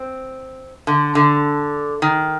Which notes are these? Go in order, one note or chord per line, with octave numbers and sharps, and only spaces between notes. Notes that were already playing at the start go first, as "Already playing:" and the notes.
Already playing: C4
D3
D3
D#3